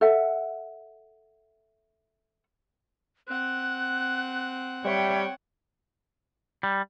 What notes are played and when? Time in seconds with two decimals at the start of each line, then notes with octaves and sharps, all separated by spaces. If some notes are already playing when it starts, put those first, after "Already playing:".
0.01 A4 E5 F#5
3.28 C4 F#5 F#6
4.85 G3 C#5 E5 G5
6.63 G3